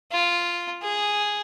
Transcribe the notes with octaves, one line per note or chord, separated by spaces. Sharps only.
F4
G#4